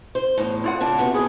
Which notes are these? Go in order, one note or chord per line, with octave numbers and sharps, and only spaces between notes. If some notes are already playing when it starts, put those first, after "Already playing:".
C5
E2 A2
E4 F4 F#5
C#3 A3 D4
C3 B3 F#4
B3 G#4